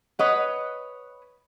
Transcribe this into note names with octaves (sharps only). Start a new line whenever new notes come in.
B4 C#5 D#5 F#5